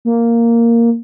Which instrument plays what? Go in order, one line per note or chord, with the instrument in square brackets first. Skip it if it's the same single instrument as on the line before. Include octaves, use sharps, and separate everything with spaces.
[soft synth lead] A#3